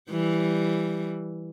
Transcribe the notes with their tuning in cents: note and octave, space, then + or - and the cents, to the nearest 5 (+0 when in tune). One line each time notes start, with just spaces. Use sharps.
E3 +0 G3 +0